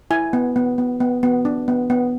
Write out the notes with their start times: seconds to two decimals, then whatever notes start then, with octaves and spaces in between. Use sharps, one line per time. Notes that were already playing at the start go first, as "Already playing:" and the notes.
0.11 E4 G#5
0.33 B3
0.56 B3
0.78 B3
1.00 B3
1.23 B3
1.45 D4
1.68 B3
1.90 B3